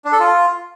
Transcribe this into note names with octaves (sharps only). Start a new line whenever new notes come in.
D4
A4
F4